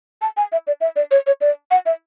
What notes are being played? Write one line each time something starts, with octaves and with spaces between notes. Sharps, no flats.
A5
G#5
E5
D5
E5
D5
C#5
C#5
D5
F#5
E5